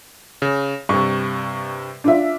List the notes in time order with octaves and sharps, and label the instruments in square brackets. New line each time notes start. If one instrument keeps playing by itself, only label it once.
[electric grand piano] C#3
[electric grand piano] G2 C3 [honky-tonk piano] C#6
[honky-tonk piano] D4 F4 E5